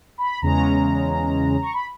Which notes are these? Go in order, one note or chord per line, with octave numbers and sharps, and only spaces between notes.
B5
E2 C#3 G#3 C#4 A#5
C#6
B5